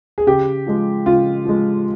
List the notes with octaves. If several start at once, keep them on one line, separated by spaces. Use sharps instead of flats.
G#4
C#3 G4
F3 G#3
C#3 F4
F3 G#3